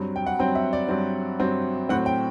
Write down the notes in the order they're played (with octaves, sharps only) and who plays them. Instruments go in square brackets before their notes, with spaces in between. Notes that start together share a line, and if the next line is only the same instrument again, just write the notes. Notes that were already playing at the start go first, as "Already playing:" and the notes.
Already playing: [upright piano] G2 F#3 C4
G5
F#5
G2 F#3 C4 G5
E5
D5
G2 F#3 C4
G2 F#3 C4
A2 F#3 C4 F#5
G5